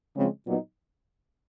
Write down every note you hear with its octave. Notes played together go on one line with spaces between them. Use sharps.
C#3 F3 G#3 C4
A#2 F#3 B3 D#4